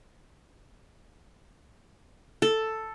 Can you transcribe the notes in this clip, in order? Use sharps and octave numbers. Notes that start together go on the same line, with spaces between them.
A4